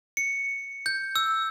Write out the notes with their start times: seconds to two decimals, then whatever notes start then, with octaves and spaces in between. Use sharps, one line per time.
0.17 C#7
0.86 G6
1.16 E6